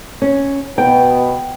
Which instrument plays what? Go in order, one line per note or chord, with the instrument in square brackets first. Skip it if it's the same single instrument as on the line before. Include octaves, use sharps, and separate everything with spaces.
[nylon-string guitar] C#4
[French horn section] B2 B3 [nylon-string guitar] G5